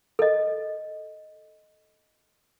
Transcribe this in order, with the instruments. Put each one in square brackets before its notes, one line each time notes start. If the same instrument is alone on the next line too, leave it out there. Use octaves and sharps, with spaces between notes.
[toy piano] A4 D#5